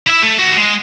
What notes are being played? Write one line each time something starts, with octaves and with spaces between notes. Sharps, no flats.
E4 E5
A3
D#2 F#4
G#3